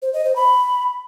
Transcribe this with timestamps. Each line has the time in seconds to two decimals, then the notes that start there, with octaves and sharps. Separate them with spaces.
0.02 C5
0.13 D#5
0.25 C5
0.36 B5